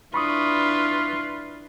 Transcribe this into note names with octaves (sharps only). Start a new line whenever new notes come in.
D4 E4 F4 B4 B5 C#6 D#6